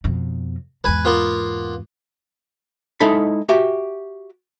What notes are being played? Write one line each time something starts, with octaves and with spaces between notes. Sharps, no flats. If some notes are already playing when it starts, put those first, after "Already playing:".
F2 B2
E2 G#2 B4 G#5
A#3 B3 F4
G#3 D#4 E4 A4 B5
F#4 G4 E5 G#5